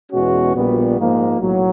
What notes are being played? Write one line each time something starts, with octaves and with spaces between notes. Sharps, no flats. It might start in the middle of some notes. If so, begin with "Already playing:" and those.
E2 B2 G#3 C#4 F#4
A#1 A#2 G3 B3
G#2 F3 A#3
B1 A2 F#3